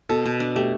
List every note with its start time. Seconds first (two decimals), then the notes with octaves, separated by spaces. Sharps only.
0.09 B2 A4
0.25 B2
0.40 D4
0.56 A3 G4